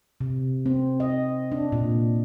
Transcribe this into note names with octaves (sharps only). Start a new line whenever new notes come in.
C3
C4
D#5
D4
A#2